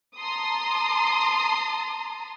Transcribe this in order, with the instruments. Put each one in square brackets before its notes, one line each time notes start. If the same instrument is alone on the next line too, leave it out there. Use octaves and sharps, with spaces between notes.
[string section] A5 A#5 C6 D#6